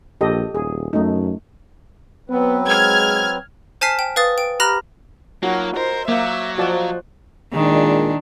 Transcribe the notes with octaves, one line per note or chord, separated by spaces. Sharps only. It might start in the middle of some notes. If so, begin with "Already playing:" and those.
A#1 G4 A4 D#5
D#1 G#4
F#2 A3 D#4
F#3 B3 C4 B4
G#3 F6 G#6
C5 G#5 A5 F6 B6 C7
G5
B4 F5 D#6 A6
G5 D7
G4 A#5 B5 F6 F#6 A#6
F#3 A#3 D#4 F4 F#4
A#4 C5 D#5
F#3 A#3 E5 D6 G6
F3 F#4 C5 D5 D#5 F5 A5
A#2 D#3 G#3 D4